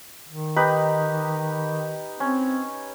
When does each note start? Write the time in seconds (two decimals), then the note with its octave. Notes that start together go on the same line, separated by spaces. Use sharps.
0.28 D#3
0.56 D#4 G4 B4
2.20 C4 C#4